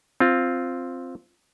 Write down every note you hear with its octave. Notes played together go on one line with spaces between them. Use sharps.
C4 F4